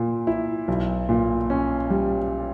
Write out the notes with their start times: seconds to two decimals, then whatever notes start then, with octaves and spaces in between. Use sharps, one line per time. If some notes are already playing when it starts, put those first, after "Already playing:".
Already playing: A#2 A#3
0.27 E4
0.68 B1
1.09 A#2
1.50 C#4
1.90 G3